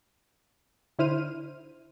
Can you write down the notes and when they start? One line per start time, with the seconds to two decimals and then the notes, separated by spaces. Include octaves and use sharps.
0.99 D3 E4 C5 F6 D#7